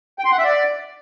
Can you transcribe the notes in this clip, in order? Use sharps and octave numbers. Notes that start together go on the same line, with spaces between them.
G5
C6
F#5
E5
D5